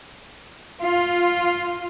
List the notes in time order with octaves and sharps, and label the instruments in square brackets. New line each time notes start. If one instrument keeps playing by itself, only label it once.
[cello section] F4